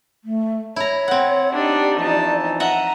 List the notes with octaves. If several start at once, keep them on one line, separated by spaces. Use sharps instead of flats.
A3
E4 C#5 A#5
C4 F#5
D4 D#4 G4 D5
E3 F3 D#4 A5
D#5 E5 F#5 A#5